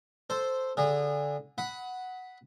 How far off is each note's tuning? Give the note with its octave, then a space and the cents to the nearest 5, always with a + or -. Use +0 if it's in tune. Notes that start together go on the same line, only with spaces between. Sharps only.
A4 +0 C5 +0
D3 -15 G#4 -35
F#5 +0 B5 +0 D#6 +30